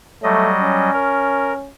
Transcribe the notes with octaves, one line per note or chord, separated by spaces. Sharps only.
F#3 G3 A3 D#5
C#4
A#4